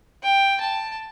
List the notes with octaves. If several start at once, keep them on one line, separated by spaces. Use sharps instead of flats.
G5
A5